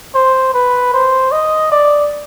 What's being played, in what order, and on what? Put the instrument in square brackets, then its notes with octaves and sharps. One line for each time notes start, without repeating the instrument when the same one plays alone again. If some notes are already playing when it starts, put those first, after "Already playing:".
[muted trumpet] C5
B4
C5
D#5
D5